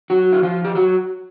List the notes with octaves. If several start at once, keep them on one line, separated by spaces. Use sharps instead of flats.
F#3 F#4
E4
F3 F4
G4
F#3 F#4